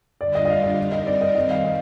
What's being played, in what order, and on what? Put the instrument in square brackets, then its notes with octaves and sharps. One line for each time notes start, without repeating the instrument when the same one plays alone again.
[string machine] D3 G3 D4 F4 [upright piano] D5
[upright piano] D#5
D#5
F5
D#5
[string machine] G3 C4 D#4 A#4
[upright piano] D#5
D5
D#5
[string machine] D#3 G3 C4 [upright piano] D#5
[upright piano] F5
D#5